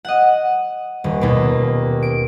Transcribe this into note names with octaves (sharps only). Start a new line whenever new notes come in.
D#5 F#5
D#1
D#2 B2
D7